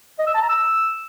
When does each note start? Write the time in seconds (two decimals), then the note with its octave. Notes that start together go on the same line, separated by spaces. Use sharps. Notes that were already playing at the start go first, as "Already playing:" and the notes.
0.19 D#5
0.26 E6
0.34 A5
0.41 A#5
0.49 E6